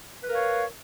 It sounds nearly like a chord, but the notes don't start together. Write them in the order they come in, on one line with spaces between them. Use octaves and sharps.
B4 A#4 F5 C#5